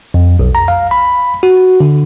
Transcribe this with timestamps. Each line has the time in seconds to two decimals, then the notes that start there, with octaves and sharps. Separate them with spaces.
0.14 F2
0.39 B1
0.55 A#5
0.68 F5
0.91 B5
1.43 F#4
1.80 D3